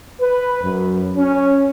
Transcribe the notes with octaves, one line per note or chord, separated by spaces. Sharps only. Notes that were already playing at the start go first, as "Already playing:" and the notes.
B4
F#2
C#4